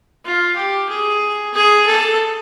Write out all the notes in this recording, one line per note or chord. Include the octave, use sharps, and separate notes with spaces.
F4
G4
G#4
G#4
A4